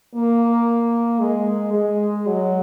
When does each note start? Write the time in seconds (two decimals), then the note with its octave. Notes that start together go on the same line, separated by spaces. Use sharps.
0.15 A#3
1.20 G#3
1.73 G#3
2.27 F#3